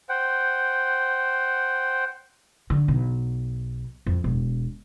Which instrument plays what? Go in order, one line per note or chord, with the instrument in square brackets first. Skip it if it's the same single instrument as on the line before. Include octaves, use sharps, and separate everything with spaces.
[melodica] C5 F#5 G5
[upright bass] D3
B1
F2
E1